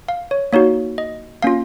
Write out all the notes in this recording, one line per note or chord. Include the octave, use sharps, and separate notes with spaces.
F5
C#5
A#3 D#4 F#4 C#5
D#5
A#3 C#4 F4 F5